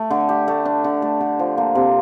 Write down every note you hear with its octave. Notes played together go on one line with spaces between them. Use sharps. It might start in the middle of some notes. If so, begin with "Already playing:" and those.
Already playing: A3
D3
G4
A3
D4
D3
A3
D3
F3
A#3
C3